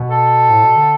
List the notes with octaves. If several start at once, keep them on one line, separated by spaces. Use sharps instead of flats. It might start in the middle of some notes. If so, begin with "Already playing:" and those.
Already playing: B2
A4
A2
B2
D3